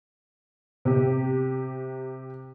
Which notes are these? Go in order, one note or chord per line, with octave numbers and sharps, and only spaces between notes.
C3 G4